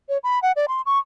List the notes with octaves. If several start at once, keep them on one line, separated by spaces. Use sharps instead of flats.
C#5
B5
F#5
D5
C6
C#6